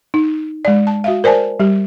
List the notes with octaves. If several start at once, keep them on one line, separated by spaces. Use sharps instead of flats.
D#4
G#3 D5
A5
F#4 E5 F5
A#4 C5 D5 G#5 A5
G3 G4